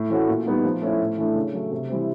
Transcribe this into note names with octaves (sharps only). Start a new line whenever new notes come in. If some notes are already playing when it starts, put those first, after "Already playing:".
Already playing: A2
E3 A3 C#4 F#4
A#2
G3 B3 D#4
F3
A3 C#4 E4
A2
E3 A3 D4
C#3
F#3 A3
C3
E3 G3 C4